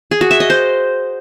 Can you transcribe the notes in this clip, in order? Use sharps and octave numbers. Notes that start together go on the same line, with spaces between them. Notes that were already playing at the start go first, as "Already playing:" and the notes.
G#4
F#4
E5
D#5
C5